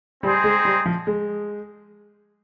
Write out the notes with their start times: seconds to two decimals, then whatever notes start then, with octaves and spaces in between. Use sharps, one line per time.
0.23 G3 C4 D#4 G#4 C5
0.44 G#3
0.65 G3
0.86 F3
1.07 G#3